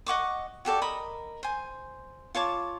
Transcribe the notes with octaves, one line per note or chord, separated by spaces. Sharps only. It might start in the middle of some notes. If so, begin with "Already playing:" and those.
D#5 F#5 C#6 D6
F#4 G4 A4 D5
A#4 D#5 B5 D#6
C5 G#5
F4 C#5 A5 D6